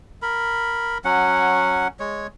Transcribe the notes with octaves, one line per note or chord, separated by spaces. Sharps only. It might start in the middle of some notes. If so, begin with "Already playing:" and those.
A#4 B5
F#3 C#4 F#5
G#3 C#5